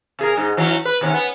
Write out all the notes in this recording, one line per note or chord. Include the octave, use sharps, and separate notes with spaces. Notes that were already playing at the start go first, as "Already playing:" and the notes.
C3 G#4 A#4
G#2 D#4
E3 F#3 C#4
B4
D#2 C3 C#4
B3